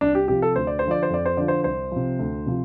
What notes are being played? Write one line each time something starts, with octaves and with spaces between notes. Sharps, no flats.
C2 D4
G4
C3 F3 G4
A4
D2 C5
D5
D3 C5
F3 D5
C5
F2 D5
C5
D3 F3 D5
C5
C2 C5
C3 F3
D2
C3 F3